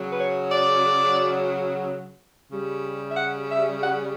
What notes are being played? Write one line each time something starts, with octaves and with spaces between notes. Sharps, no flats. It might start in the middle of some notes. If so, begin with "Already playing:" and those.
Already playing: C#3 F#3
B4
C#5
D5
C#3 G3
E5
F#5
E5
F#5